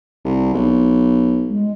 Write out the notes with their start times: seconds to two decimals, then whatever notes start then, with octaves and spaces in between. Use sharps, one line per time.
0.25 C2
0.54 B1
1.49 G#3